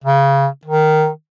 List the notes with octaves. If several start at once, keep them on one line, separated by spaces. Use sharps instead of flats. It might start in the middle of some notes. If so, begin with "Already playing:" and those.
C#3
D#3